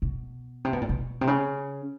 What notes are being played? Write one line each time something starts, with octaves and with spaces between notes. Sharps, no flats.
B2
C3
B2
A#2
B2
C3
C#3